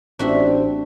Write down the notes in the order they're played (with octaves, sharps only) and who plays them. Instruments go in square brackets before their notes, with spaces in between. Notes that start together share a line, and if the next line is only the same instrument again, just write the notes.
[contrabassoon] A1 [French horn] C4 [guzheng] D4 F#4 E5